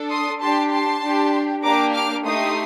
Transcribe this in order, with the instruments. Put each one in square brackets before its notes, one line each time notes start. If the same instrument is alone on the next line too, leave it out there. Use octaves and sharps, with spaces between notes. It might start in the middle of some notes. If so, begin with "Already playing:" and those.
Already playing: [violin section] D4 A4
C6 D#6
D4 G4 A5 C6
A5 C6
D4 G4
A#3 D4 G4 A#5 D6
D6 F6
A3 D#4 G4 C6 D#6